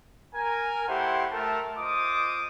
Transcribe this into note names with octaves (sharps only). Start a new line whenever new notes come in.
A#4 G#5 A#5
A3 E4 G4 C5 F#5 C6
A3 A#4 A5
F4 C5 D#5 D6 D#6